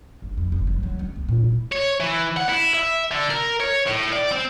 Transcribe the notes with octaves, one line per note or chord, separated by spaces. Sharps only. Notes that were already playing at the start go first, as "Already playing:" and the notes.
G1
F2
F#1
F#3
F#3
C#2
B3
A#2
E4
C#5
E3
F#5
E4
E5
D3
A#4
C#5
A2
D5
C4